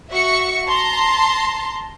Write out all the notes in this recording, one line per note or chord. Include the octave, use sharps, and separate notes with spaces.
F#4 E5 C#6 C#7
A5 A#5 C6